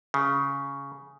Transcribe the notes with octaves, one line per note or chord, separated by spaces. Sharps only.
C#3